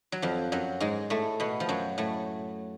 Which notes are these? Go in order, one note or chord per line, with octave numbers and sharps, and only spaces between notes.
F#3
F2 F3
F#2 F#3
G#2 G#3
A2 A3
B2 B3
F3
F#2 F#3
A2 A3